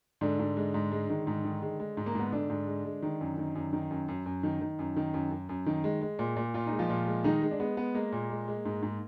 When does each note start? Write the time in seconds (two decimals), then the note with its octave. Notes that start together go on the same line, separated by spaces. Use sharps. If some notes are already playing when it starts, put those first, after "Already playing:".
0.21 G#2 D3 D4
0.39 G#2
0.57 G#3
0.74 G#2
0.92 G#3
1.10 D#3
1.27 G#2
1.45 D#3
1.62 G#3
1.80 G#3
1.97 G#2
2.06 A#3
2.15 G#2 B3
2.32 G#2 D3 D4
2.50 G#2
2.67 G#3
2.85 G#3
3.02 D#3
3.21 F#2
3.38 D#3
3.55 F#2
3.73 D#3
3.91 F#2
4.08 F#2
4.26 F#2
4.43 D#3
4.61 D#3
4.79 F#2
4.96 D#3
5.14 F#2
5.31 F#2
5.49 F#2
5.66 D#3
5.84 G#3
6.02 G#3
6.19 A#2
6.36 A#2
6.54 A#2 F4
6.67 D#4
6.72 G#3
6.79 F3 F4
6.89 A#2
7.07 G#3
7.24 D#3 G#3 D#4
7.42 G#3
7.51 D4
7.60 G#3 B3
7.77 G#3 B3
7.95 G#3 A#3
8.12 A#2
8.30 G#3
8.48 G#3
8.65 G#2
8.83 G#2